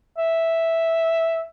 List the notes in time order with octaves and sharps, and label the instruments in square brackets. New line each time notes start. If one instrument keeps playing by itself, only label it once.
[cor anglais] E5